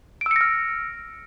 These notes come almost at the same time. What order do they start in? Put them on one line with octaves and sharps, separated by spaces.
D7 E6 C#7 A#6 F6